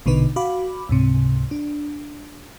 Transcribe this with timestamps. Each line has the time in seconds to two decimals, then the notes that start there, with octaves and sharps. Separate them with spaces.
0.06 A#1 B2 D3 D#4 B4
0.36 F#4 F5 B5 D6
0.89 C#2 G#2 C3
1.51 D4